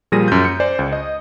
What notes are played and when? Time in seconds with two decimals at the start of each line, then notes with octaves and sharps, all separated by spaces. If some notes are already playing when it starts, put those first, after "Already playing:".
0.12 A#2 F3 G3 G#4 A#6 D#7
0.28 F#2 G6
0.45 C#7
0.60 C5 D5 G#5
0.79 C#2
0.92 D#5